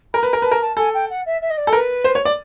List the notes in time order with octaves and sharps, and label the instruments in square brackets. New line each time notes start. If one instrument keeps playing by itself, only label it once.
[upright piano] A#4 [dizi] A#5 B5
[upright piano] B4
A#4
[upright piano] B4 [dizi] A5
[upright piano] A#4
[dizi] A5
[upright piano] A4 [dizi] G#5
[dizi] G5
F#5
E5
E5
D#5
D5
[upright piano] A4
[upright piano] A#4 [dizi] B4
[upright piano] C5
C#5
D5